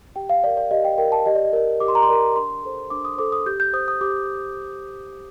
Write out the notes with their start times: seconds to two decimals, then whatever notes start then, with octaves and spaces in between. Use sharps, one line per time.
0.16 G4 G5
0.29 F5
0.44 A#4 D5
0.57 D5
0.71 G4 D#5
0.84 G5
0.98 A#4 D5 G5
1.12 A5
1.26 G4 D#5
1.35 D5
1.45 D#5
1.53 A#4 D5
1.80 G4 D6
1.88 C6
1.95 A#5
2.03 C6
2.08 A#4 D5
2.36 D4 C6
2.64 A4 C5
2.90 D4 D6
3.05 D#6
3.18 A4 C5 D6
3.32 D#6
3.46 G4 G6
3.60 G6
3.73 C5 D#6
3.88 D#6
4.01 G4 D6